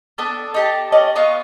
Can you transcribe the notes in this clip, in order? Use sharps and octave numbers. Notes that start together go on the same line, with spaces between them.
B3 D4 A4
D#4 G4 A5
C#4 F#4 D5 D#5
B3 D#4 F4 C#6